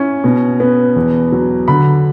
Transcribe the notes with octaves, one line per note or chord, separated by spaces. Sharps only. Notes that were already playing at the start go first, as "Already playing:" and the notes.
Already playing: C#4 E4
B2
B3
E2
F#3
D3 B5